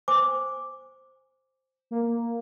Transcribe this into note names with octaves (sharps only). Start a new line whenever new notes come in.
C5 G#5 D6
A#3